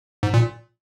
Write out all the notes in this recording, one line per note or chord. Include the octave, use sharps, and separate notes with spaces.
G#2
A#2